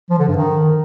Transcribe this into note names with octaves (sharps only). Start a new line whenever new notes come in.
F3
D3
G2
D#3